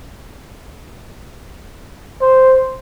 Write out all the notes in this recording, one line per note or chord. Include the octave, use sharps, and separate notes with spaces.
C5